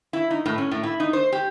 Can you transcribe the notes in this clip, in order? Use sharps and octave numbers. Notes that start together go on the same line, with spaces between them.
E4
D#4
A2
C#4
A2
E4
D#4
C5
G4